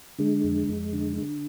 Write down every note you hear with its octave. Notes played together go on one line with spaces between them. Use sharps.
D3 G#3
F2
F2
D3
D3